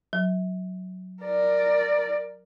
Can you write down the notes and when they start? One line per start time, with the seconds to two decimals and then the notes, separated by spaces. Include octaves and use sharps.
0.13 F#3
1.23 A#4 D5